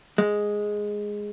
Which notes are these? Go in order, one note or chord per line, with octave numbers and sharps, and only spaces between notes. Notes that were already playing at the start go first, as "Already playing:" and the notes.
G#3